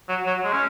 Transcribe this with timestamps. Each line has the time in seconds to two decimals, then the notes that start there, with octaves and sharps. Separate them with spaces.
0.09 F#3
0.26 F#3
0.44 G#3
0.53 C#4